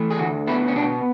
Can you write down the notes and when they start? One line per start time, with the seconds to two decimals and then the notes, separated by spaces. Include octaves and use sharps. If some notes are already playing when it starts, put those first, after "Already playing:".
Already playing: E3 A3
0.10 G#4
0.19 D2 F#4
0.47 B3 E4
0.68 C#4
0.75 B2 D4